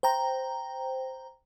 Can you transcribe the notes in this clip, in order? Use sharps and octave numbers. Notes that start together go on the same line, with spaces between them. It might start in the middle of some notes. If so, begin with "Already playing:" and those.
C5 G5 A#5